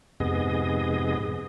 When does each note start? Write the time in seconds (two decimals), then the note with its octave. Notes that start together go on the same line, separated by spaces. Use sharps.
0.20 F2 G#2 C3 B3 G#4 D#5